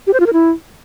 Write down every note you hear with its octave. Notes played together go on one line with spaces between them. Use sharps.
G4
C5
F4
A#4
E4